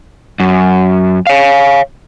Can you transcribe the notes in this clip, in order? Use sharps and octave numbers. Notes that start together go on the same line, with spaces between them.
F#2
C#5 F5